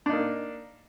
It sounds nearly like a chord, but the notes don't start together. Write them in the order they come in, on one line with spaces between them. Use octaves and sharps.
D4 D#4 A#3